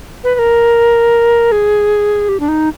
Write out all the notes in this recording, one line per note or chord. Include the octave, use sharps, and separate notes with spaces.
B4
B4
A#4
G#4
G4
D4
D#4